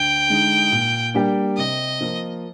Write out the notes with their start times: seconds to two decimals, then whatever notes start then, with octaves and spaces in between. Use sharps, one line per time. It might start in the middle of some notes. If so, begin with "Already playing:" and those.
Already playing: D2 G5
0.28 D3 G#3 D#4
0.72 A#2
1.14 G3 A#3 D4 G4
1.57 C3 D#5
2.01 F3 A#3 F4